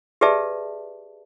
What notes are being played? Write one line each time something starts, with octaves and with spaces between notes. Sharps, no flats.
G4 G#4 B4 D5 E5 A5